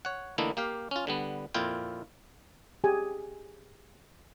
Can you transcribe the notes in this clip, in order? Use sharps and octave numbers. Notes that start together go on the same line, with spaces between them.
C#5 F#5
D3 E3 A3 A#3 D#4 E4
A#3 G4 F5
C#4 F4
D3 G3 B3
F2 A#2 E4 F4 G5
G4 G#4 G#5